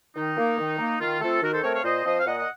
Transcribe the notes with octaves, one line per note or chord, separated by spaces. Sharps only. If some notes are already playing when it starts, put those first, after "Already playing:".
D#3 D#4
A#3
D#3
A#3
D#3 F4
A3 C4 F4 A4
D#3 F#4 A#4
A4 C5
A3 C4 A#4 C#5
C#5 F5
A#2 C5 D#5
F3 C4 C5 D#5
F5
A#2 D#5 F#5
D#5